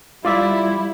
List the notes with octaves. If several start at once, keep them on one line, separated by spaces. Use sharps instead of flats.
G3 E4 F4 D5 E5